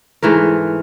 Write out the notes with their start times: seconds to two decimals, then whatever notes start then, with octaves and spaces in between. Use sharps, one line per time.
0.23 G#2 E3 A3 A#4